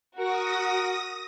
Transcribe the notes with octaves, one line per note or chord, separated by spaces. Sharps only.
F#4 A#4 D#6 A#6